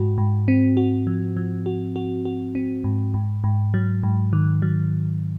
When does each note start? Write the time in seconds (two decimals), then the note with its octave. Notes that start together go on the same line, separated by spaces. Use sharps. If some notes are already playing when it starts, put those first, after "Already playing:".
Already playing: G#2 F#4
0.18 G#2
0.48 C4
0.77 F#4
1.07 F3
1.37 F3
1.66 F#4
1.96 F#4
2.25 F#4
2.55 C4
2.84 G#2
3.14 G#2
3.44 G#2
3.74 F#3
4.03 G#2
4.33 D#3
4.62 F#3